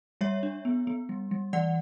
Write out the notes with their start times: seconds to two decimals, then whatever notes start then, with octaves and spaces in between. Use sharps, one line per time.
0.21 G3 C#5 E5
0.43 D4
0.65 B3
0.87 B3
1.09 G3
1.31 G3
1.53 E3 D5 F#5